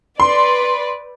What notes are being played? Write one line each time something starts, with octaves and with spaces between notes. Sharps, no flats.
B4 D5 C6